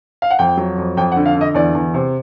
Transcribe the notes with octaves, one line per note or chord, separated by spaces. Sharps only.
F5
F#5
F2 G5
F#3
F2
F2 G5
F#5
D3
F5
D3
D#5
E2 D5
E2
C3